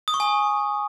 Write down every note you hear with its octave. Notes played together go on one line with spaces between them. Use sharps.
D#6
C#6
G#5